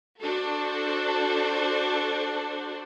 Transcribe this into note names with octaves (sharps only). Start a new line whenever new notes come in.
D4 F#4 A4 C5